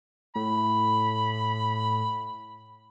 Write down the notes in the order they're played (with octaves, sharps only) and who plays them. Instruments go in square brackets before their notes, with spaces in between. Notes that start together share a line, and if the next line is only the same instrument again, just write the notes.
[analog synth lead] A2 [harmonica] B5